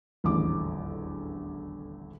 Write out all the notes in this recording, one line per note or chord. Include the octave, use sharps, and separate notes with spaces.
D#1 A1 E2 D3 D6